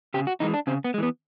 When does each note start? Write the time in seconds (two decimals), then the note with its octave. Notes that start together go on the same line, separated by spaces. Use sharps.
0.14 C#3 G4
0.27 F#4
0.40 E3 G#3 D#4
0.54 D4
0.67 C#3 C4
0.84 B3
0.94 G#3
0.98 E3 B3